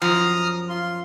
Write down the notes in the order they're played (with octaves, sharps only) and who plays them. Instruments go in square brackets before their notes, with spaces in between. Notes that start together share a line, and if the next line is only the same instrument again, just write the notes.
[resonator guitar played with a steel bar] F#2 F3 [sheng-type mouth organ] A#5 D#6 F6
[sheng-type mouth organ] F4 C6